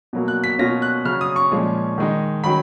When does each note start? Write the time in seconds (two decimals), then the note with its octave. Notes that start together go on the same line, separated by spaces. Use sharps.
0.13 B2 F#3 A#3
0.28 F#6
0.44 B6
0.59 B2 A#3 C#4 F4 A#6
0.82 F#6
1.05 C#3 F#3 C#4 F6
1.21 D#6
1.36 C#6
1.51 A#2 F3 G#3 C#4
1.98 D#3 G#3 D#4
2.44 D#3 F#3 C#4 B5